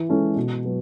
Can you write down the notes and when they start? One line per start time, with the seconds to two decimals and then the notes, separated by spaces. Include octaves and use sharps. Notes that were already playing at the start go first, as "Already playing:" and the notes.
Already playing: E3
0.09 G#3 C#4 E4 A4
0.36 B2
0.65 F#3 B3